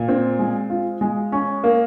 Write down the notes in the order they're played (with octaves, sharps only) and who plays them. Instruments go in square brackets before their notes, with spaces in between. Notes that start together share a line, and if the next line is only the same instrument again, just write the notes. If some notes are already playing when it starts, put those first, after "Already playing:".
Already playing: [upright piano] A#2
C4
G#3
F4
G#3
C#4
A#3